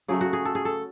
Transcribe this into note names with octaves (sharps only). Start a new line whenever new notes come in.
C#3 F#3 A3 G#4
F#4
G#4
A4
G#4
A4